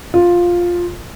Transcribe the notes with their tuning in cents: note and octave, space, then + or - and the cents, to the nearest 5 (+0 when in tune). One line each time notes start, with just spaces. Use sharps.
F4 +5